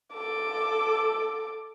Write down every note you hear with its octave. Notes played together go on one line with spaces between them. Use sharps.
A4 D6